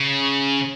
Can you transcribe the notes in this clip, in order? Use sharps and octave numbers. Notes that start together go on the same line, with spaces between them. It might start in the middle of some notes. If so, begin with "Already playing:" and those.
Already playing: C#3